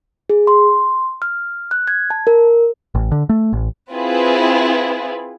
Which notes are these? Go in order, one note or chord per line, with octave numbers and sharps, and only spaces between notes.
G#4
C6
F6
F#6
G#6
A5
A#4
A1
D3
A3
A1
C4 E4 F4 G#4 B4